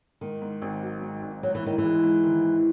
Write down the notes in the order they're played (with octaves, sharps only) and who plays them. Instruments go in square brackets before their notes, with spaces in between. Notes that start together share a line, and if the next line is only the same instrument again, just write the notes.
[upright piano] G#2 [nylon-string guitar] D#3
[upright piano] G#2
G#1
F#3
G#2
G#1
[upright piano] G#2 [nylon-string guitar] F#3
[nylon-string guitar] E3
[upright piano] G#2 [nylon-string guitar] D#3
[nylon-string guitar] E3
[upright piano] G#3
G#2
D#3
G#2